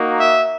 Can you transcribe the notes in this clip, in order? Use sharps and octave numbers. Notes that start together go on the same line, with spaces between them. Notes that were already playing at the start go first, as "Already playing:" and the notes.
Already playing: A#3 D#4 F#4
E5